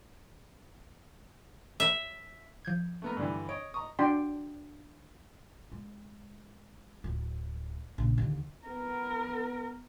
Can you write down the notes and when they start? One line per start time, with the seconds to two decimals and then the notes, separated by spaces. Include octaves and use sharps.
1.80 E5
2.65 F3 G6 G#6
3.02 A3 B3 A#4
3.17 G2 D3 E3
3.49 C#5 D#5 D7
3.74 D#5 A#5 C#6 D#6
3.99 D4 F#4 D5 G5 C6
5.72 G#3
7.04 D1
7.98 A#1 C#3
8.18 D#2 D3
8.67 B3 A#4